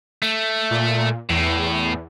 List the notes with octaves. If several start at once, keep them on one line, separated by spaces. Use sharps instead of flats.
A3
A#2
E2 A2